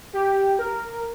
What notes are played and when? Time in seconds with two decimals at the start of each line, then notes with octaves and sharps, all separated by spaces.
0.13 G4
0.59 A#4